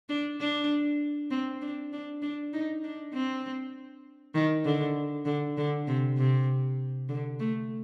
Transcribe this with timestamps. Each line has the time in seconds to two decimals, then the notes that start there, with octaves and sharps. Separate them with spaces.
0.09 D4
0.40 D4
1.31 C4
1.62 D4
1.93 D4
2.22 D4
2.53 D#4
2.84 D4
3.14 C4
4.35 D#3
4.65 D3
5.26 D3
5.57 D3
5.87 C3
6.18 C3
7.09 D3
7.40 A3